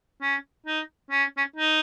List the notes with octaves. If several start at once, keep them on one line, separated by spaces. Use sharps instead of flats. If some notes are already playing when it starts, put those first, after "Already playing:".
C#4
D#4
C#4
C#4
D#4